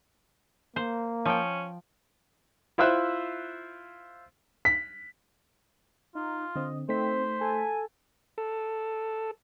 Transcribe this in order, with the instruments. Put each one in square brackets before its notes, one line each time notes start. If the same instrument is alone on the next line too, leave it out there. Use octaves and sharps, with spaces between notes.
[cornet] A#3 [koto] C5
[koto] F3 G5 [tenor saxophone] C#4
[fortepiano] E4 F4 C5 E5 E6 F#6
[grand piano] B6
[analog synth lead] D#4 [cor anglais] F4
[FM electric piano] D3 C4 [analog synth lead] D#5
[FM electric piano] A3 D#4 B6 [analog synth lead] C4 [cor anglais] C5
[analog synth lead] A4 [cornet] G#5
[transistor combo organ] A4